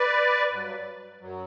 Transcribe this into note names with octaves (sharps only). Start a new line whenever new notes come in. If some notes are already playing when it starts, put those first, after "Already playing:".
Already playing: B4 D5
G2 F#3
F#2 F#3